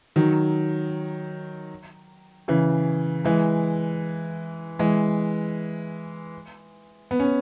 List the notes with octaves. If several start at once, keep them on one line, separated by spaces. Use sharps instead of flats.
D#3 F#3
C#3 E3
E3 G#3
E3 G#3
B3
C#4